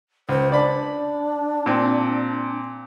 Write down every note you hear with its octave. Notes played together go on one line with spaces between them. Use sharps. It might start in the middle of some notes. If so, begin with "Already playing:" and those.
C#2 C5
D4 D5 B5
A#2 C4